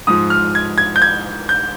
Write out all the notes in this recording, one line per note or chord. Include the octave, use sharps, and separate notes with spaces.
G#2 F3 D#6
F6
G#6
G#6
G6
G#6
G6